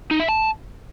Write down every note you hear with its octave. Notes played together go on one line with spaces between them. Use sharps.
D#4
E5
A5